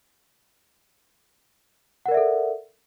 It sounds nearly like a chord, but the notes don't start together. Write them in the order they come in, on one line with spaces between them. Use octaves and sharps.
F#5 A#4 D5 E5 A4